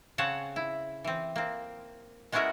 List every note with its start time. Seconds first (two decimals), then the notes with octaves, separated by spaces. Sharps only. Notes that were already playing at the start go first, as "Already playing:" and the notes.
0.18 C#3 C4 C#5 F#5 A5
0.56 E4
1.04 E3 C4
1.36 A#3 C4
2.32 G#3 B3 C#4 E4 F#4 A#4